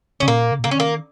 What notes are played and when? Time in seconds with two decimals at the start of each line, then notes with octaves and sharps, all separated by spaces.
0.20 C#3 C#4
0.28 A#2 A#3
0.52 C#3
0.59 A#2
0.64 A#3
0.67 C#3
0.71 C#4
0.75 D#3 A#3